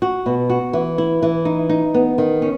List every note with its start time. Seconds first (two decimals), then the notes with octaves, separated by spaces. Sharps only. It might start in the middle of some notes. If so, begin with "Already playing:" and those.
0.02 F#4
0.26 B2
0.50 F#4
0.73 E3
0.98 E4
1.22 E3
1.45 D#4
1.69 D#4
1.94 B3
2.18 D#3
2.42 C#4